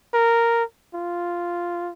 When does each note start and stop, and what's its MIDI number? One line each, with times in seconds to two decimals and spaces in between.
0.14 0.63 70
0.94 1.91 65